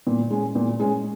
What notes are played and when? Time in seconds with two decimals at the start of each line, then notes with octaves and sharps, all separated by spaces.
0.07 A#2
0.31 G#3 C#4
0.55 A#2
0.80 G#3 C#4